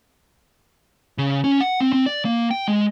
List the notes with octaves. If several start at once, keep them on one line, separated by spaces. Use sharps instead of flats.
C#3
C#4
F#5
C4
C4
D5
A#3
G5
G#3